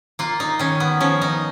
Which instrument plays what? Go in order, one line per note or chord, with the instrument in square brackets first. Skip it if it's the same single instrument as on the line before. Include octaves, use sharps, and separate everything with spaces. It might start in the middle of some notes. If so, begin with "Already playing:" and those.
[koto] A#3 F4
D#4
D#3 C#4
B3
F3 C#4
D#4